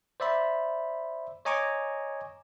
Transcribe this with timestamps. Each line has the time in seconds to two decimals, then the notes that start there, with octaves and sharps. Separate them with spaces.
0.20 C5 D5 E5 B5
1.45 C#5 D#5 G#5 A#5 C#6 D6